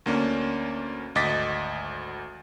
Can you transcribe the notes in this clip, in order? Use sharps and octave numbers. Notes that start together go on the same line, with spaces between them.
D2 A#3 C#4 D4
G#1 D2 D#5 D6 A6 B6